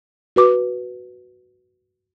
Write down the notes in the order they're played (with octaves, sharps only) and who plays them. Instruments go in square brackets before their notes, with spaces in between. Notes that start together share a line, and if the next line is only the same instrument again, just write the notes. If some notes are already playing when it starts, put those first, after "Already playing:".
[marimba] F#4 B4 D6